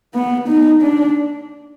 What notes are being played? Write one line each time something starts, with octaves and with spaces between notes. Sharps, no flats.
B3
D#4
D4